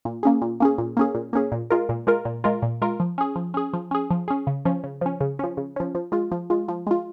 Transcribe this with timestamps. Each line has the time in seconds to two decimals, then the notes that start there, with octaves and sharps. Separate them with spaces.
0.05 A#2
0.23 A#3 C#4 G#4
0.42 A#2
0.60 A#3 C#4 G#4
0.78 A#2
0.97 A#3 C#4 G#4
1.15 A#2
1.33 A#3 C#4 G#4
1.52 A#2
1.70 G#3 F4 A#4
1.89 A#2
2.07 G#3 F4 A#4
2.25 A#2
2.44 G#3 F4 A#4
2.62 A#2
2.82 G#3 F4 A#4
3.00 F3
3.18 C#4 G#4
3.36 F3
3.54 C#4 G#4
3.73 F3
3.91 C#4 G#4
4.11 F3
4.28 C#4 G#4
4.47 C#3
4.65 F3 C#4
4.84 C#3
5.01 F3 C#4
5.21 C#3
5.39 F3 C#4
5.57 C#3
5.76 F3 C#4
5.95 F3
6.12 G#3 F4
6.32 F3
6.50 G#3 F4
6.68 F3
6.87 G#3 F4